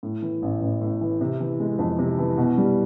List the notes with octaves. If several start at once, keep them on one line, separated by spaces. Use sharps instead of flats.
A2
E3
A1
A1
A2
E3
C3
E3
G#3
F2
C3
E3
B2
G3